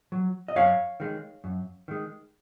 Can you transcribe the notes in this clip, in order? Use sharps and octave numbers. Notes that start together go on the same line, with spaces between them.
F#3
D#5
F#2 C#5 F5
D#3 G#3
F#2
D#3 G#3